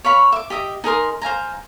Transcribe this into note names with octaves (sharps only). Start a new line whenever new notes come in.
C#5 F5 B5 C#6
E5 D6
G4 D#5 E5 D6
D#4 G#4 A#4 C6
C5 F5 G#5 A#5